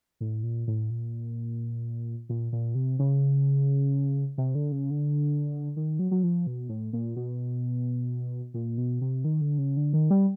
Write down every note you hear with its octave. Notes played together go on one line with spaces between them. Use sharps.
A2
A#2
A2
A#2
A#2
A#2
C3
C#3
C3
D3
C#3
D3
D#3
F#3
F#3
F3
B2
A2
A#2
B2
A#2
B2
C3
D#3
D3
C#3
D3
D#3
G3